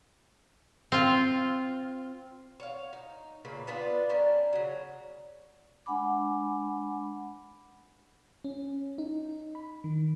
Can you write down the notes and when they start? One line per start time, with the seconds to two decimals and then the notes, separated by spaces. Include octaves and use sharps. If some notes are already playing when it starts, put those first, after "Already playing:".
0.92 C4 F4
2.60 C#5 F5
2.93 D#4
3.45 A#2 C#3 A#3 B4
3.67 B3 D4 F4 B4
4.09 C#4 D4 A#4 G5
4.53 C#3 F#3
5.86 G#3 D4 F#5 G#5 B5 D6
8.44 C#4
8.98 D#4
9.55 B5
9.84 D#3